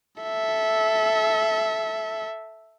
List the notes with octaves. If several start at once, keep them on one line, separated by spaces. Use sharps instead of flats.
A4 E5